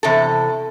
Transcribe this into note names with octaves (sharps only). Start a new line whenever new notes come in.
E2 C3 A4